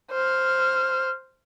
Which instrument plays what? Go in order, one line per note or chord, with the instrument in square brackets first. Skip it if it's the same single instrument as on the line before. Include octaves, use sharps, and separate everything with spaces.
[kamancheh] C5 F6